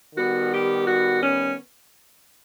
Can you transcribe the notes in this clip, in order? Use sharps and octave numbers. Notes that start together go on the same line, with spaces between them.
D#3 G3 B3 F#4
G4
F#4
C#4